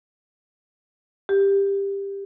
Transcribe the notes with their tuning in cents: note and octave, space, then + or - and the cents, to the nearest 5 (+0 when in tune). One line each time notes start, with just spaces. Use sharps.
G4 +15